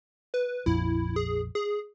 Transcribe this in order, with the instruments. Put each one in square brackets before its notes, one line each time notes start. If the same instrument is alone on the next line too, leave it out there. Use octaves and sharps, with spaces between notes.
[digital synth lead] B4
[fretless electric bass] A#1 F2 [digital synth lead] E4
[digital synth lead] G#4
G#4